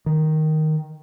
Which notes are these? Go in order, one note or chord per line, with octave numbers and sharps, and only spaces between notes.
D#3